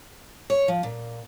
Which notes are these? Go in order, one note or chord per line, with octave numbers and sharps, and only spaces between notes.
C#5
F3
A#2